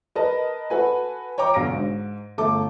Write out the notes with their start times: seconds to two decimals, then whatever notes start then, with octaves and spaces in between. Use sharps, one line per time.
0.15 A#4 B4 D#5 A5
0.70 F#4 A4 B4 G#5
1.38 C#5 G5 A#5 D6
1.54 B1 D3 F5 A#6 D7
1.72 G#2
2.38 G1 A3 A4 D6